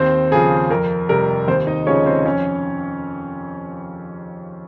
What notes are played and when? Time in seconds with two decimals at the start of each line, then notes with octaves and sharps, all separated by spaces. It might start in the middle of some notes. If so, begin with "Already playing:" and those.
Already playing: D#2 C4 C5
0.31 C#3 F3 G#4
0.70 F2 A#4
1.09 C3 G3 A#4
1.48 D#2 C4 C5
1.67 D#4 D#5
1.87 C#3 F3 G#3 C#4 C#5
2.06 C4 C5
2.25 F2 C#4 C#5